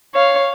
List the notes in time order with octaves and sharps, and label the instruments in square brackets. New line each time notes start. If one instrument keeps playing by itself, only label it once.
[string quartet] C#5 F5